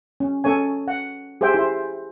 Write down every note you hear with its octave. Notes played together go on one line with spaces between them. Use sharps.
C#4
C#4 A4 C#5 G#5
F#5
G4 G#4 C5 E5 G5
E4 C5